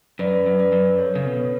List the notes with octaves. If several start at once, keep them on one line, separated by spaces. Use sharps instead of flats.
F#2 B4 D5
F#2
B4 D5
F#2
A4 C#5
C#3
B2 B4